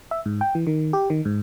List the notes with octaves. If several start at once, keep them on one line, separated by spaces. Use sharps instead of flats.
E5
G#2
G5
E3
D#3
G4
D#3
G#2